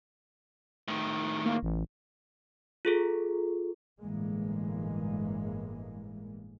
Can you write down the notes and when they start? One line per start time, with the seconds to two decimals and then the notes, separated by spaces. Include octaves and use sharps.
0.88 A2 D#3
1.46 A#3
1.63 A1
2.85 F4 G#4 A4
4.01 G1 A2 E3 G#3 A#3